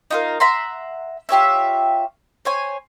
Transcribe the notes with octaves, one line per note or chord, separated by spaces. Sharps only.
D#4 F4 A#4
E5 F#5 A#5 C6
F4 G4 C#5 E5
C5 C#5 G#5